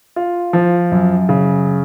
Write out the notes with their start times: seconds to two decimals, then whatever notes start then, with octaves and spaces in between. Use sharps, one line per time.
0.16 F4
0.53 F3
0.92 F#2
1.29 C#3